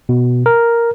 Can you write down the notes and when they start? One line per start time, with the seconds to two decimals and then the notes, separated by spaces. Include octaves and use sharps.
0.09 B2
0.46 A#4